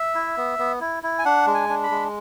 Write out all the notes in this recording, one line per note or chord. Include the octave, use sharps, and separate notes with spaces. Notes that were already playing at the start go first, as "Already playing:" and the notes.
Already playing: E5
E4
B3
B3
E4
E4
G#5
D4 F#5
G#3
G#5
D4
B5
G#3